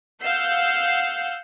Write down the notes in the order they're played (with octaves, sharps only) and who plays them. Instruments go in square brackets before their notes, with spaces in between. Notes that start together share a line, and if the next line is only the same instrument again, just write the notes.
[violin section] F5 F#5 E6 G6 C7